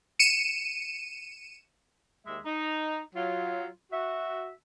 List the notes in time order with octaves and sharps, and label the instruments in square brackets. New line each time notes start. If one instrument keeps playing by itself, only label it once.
[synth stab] C#7 D#7 E7
[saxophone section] D#2 G#3 E5
D#4
F#3 F4
F#4 E5